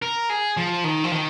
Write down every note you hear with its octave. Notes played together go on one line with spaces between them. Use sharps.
A#4
G#4
F3
D#3
F3
D#3